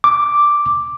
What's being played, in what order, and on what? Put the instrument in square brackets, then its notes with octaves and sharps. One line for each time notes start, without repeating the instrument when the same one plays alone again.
[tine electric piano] D6